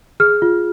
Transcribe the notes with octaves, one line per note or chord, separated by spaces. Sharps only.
G#4 F6
F4